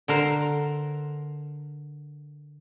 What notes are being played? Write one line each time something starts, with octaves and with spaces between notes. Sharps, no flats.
D3 A#4 C5